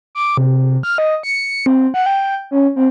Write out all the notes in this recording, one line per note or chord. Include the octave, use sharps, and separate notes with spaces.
D6
C3
F6
D#5
C#7
C4
F#5
G5
C#4
C4